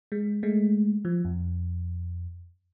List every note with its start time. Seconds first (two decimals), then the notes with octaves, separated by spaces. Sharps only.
0.12 G#3
0.43 G#3 A3
1.05 F3
1.25 F2